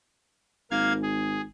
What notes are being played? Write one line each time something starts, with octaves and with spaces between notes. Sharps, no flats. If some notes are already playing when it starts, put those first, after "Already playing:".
G#1 A#3 F5 G#6
G#4